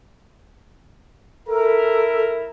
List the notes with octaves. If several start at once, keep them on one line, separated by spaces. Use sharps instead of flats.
E4 A4 A#4